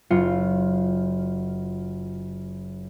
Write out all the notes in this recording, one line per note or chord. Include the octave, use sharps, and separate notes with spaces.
F#1 F4 C#7